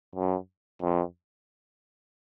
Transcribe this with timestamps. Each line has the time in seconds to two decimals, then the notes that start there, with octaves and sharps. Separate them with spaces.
0.16 F#2
0.82 F2